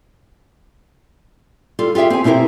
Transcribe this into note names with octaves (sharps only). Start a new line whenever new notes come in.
G3 F4 A4
F4 G4 G#4 E5 G5
C4 G#5
B2 C4 E4 G4 A#4